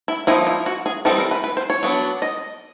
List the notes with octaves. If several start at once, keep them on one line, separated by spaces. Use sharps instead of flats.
E4
F3 A#3 D#4 E4
E4
F#4
G#4
E3 G3 C4 D#4 A4
A#4
B4
B4
C5
C#5
F#3 B3 D4
D#5